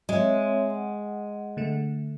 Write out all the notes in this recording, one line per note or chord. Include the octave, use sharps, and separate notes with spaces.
G#3 C4 C#5 E5
F#5
D3 A3